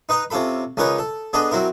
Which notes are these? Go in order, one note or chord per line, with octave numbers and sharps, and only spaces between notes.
D#4 B4 D#5 A#5
C3 C#4 F4 A4 B5
C#2 C#4 D#4 A#4 B4 C#5
A4
B3 D4 G#4 A4 D#5
F#3 C4 E4 A#4